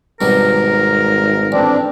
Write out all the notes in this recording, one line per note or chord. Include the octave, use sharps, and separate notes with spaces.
G#1 B2 F#3 G3 A#4
A1 C4 D4